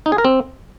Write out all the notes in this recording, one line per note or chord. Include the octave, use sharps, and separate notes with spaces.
D#4
G#4
A#4
C4